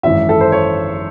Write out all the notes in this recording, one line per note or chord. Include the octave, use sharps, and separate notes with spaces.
G#1 F#2 E3 E5
A4
C5
C#5